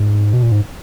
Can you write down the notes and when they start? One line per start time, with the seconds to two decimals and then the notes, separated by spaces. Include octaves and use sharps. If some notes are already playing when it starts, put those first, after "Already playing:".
Already playing: G#2
0.33 B2
0.43 A#2
0.52 G#2